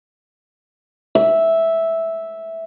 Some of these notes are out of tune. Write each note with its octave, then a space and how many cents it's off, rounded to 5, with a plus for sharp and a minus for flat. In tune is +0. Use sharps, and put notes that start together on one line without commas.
E5 -5